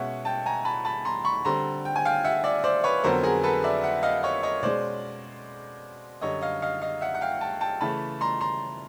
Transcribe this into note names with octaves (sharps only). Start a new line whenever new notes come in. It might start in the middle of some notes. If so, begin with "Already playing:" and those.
Already playing: B2 G#3 C#4 E5 F#5
G5 A5
G#5 A#5
A5 B5
A5 B5
A#5 C6
B5 C#6
D3 G3 C4 A#5 C6
G5
G#5
F5 G5
E5 F#5
D5 E5
C5 D5
B4 C#5
F2 D3 F#3 B3 A#4 C5
G#4 A#4
A4 B4
D5 E5
E5 F#5
D#5 F5
C#5 D#5
C#5 D#5
B2 G#3 C#4 C5 D5
F#2 D3 G3 C#5 D#5
D#5 F5
D#5 F5
D#5 F5
E5 F#5
F#5
F5 G5
G5 A5
G5 A5
C#3 E3 A3 A5 B5
A#5 C6
A#5 C6